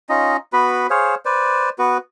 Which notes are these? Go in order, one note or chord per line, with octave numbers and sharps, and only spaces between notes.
C#4 D#4 F4 D#5
B3 F#4 B4 B5
G#4 C5 C#5 F5
B4 C5 D5
B3 F#4 B4